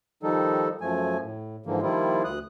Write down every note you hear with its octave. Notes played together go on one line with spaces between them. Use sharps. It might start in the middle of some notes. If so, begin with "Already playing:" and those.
D#3 F3 G3 D#4 A4
F#2 F3 A3 G#5
A2
G#2 D3 E3 F3 A#3
D#3 F3 G3 A#3 E4 F4
D2 D#6 F#6